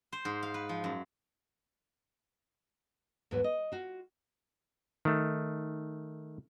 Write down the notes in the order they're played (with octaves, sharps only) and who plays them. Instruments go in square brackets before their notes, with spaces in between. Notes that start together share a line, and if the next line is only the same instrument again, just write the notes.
[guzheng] C5
G#2
F5
B4
F3
F#2
[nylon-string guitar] D#2 G#2 F#3 B3 B4
D#5
F4 F#4
[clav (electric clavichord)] D#3 A3